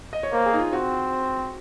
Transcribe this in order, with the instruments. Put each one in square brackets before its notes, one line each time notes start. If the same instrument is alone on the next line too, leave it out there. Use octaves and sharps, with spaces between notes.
[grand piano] D#5
C#5
[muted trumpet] A#3 [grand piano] C5
[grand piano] G#4
D#4
F4
[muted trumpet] C4 [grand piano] F#4